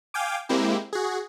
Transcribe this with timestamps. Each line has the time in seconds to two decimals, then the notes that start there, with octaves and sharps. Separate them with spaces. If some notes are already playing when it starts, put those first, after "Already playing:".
0.14 F5 G5 G#5 D6
0.49 G#3 A#3 C4 E4 G4
0.93 F#4 G#4